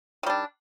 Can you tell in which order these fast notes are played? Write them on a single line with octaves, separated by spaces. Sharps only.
D#3 G3 D4